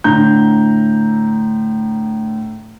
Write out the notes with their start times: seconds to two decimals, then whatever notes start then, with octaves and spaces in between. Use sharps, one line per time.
0.04 A2 D3 A#5 G6